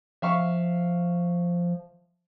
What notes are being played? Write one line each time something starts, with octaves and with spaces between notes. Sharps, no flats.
F3 E5 F5 C#6